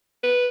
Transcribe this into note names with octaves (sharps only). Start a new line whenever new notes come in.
B4